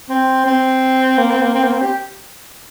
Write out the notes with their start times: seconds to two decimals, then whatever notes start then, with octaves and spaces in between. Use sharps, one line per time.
0.09 C4
0.46 C4
1.18 A#3
1.30 C4
1.42 A#3
1.54 C4
1.63 A#3
1.73 C4
1.82 G4